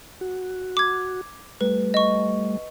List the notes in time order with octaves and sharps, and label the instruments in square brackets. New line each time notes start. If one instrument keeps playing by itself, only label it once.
[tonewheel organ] F#4
[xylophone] D6 G#6
[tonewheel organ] G3 A3 [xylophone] B4
[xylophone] D#5 C#6